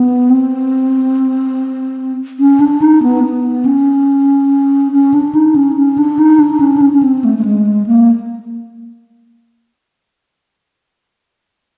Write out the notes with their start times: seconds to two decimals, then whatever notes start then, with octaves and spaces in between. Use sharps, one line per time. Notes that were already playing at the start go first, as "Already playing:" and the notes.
Already playing: B3
0.30 C4
2.40 C#4
2.60 D4
2.82 D#4
3.03 B3
3.23 B3
3.65 C#4
4.92 C#4
5.14 D4
5.35 D#4
5.56 C#4
5.76 C#4
5.98 D4
6.19 D#4
6.40 D4
6.60 C#4
6.77 D4
6.82 C#4
6.93 C#4
7.03 C4
7.24 A3
7.38 A3
7.45 G#3
7.86 A#3